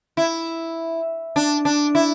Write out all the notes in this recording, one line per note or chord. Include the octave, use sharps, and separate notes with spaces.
E4
D4
D4
E4